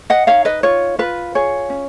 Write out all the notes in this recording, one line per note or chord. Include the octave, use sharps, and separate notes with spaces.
D#5 F#5
D#4 C#5 F5
B4 D#5
F4 C#5
F4 B4
G#4 C#5
C#4